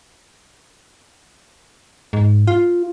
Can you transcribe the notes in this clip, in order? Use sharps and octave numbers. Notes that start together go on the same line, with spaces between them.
G#2
F4